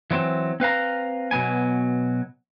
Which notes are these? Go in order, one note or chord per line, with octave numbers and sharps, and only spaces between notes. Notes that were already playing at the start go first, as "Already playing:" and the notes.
E3 F#3 C4
C4 B4 F5 A#5
B2 F#3 B3 G#5